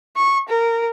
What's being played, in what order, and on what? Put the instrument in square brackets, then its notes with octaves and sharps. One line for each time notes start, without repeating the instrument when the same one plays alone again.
[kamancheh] C#6
A#4